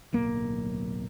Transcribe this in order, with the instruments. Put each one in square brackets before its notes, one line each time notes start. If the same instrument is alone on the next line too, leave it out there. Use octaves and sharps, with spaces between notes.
[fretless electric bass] D1 B1 A#3